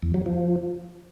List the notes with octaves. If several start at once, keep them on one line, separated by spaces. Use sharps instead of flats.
E2
F#3
F3